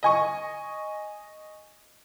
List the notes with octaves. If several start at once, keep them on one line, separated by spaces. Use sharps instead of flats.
D#5 G#5 C#6